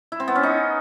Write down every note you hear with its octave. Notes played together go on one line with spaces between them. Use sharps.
E4
C4
B3
C#4
D#4